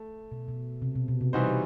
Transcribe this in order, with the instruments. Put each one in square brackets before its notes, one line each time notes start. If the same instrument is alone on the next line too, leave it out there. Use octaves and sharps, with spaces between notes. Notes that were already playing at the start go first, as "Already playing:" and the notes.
Already playing: [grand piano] A3
[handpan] B2
B2
C3
B2
B2
C3
[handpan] B2 [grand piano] E3 G3 D#4 F#4 C5